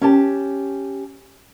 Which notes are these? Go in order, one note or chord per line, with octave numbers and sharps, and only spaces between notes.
C#4 G4 A5